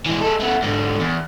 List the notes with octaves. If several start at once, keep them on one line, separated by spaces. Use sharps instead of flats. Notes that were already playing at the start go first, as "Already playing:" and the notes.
E3 G#3
G#3 A4
A3 B3
G#2 D3
E2